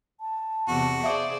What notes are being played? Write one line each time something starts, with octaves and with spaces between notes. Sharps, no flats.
A5
E2 C3 F#4
G#4 C5 D5 E5 F5 D#6